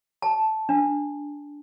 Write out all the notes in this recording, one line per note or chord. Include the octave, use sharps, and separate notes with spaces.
A5
D4